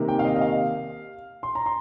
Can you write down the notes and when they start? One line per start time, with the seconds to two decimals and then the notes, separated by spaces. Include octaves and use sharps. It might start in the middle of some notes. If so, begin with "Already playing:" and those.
Already playing: C3 D#3 A#3
0.08 G5
0.19 F5
0.25 D#5
0.36 D#5
0.41 F5
1.43 C6
1.55 A#5
1.66 C6